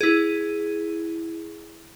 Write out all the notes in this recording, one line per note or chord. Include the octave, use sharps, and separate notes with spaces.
E4 G#4